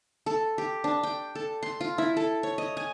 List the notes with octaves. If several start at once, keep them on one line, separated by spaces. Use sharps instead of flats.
A4
G4
D4
G5
A4
C6
F4
E4
A4
C#5
D#5
G#5